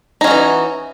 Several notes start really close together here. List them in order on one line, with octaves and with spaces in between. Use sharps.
D#4 C#4 F#4 E3